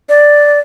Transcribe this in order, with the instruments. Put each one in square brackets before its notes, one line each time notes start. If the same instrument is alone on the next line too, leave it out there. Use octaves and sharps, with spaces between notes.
[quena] D5